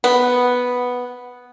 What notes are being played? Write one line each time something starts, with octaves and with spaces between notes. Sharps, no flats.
B3